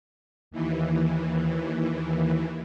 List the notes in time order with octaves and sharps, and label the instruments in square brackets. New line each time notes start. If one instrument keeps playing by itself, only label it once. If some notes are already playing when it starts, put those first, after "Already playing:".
[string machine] D#2 E3